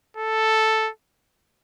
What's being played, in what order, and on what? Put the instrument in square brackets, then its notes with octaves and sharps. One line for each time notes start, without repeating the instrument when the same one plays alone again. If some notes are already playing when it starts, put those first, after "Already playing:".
[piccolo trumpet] A4